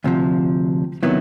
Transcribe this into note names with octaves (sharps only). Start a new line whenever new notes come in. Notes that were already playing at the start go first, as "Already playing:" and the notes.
D2 C3 F3
C3 D#3 F#3 B3 E4